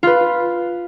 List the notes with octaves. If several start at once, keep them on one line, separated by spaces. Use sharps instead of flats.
F4 B4